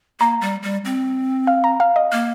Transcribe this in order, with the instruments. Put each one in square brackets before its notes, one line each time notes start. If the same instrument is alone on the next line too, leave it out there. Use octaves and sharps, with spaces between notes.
[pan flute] A#3 [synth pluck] A#5
[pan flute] G3
G3
C4
[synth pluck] F5
A#5
F5
D#5
[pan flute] A#3 [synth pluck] F6